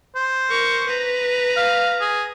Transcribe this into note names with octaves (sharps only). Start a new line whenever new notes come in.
C5
A#4 C#6
B4 A#5
F5
G#4